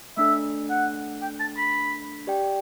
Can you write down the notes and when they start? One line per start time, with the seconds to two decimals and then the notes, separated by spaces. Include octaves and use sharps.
0.17 A3 D4 A4 E5
0.70 F#5
1.22 G5
1.40 A5
1.57 B5
2.27 G4 D5 G5